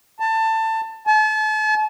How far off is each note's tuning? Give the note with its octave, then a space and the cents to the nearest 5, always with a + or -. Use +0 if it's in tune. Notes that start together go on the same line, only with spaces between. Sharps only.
A5 +20
A5 -40